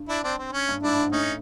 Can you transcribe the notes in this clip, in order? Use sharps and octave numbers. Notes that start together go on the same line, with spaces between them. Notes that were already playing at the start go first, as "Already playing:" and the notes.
Already playing: G2
D4 E4
C4 D4
C4
C#4
G2
G#2 D4 E4
G#2
A2 C#4 D#4